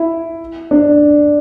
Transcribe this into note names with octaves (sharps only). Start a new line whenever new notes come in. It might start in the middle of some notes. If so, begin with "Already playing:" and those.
Already playing: E4
D4